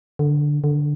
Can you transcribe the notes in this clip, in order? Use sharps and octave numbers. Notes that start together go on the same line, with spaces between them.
D3
D3